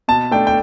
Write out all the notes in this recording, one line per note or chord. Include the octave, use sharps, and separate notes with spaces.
B2 A5
A3 D4 G5
G5